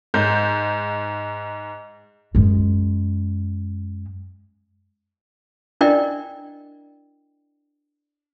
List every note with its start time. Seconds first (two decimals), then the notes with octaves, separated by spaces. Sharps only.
0.14 G#2 G6
2.35 F#2 G#3
5.81 D4 E4 A#4 D5 D#5 G5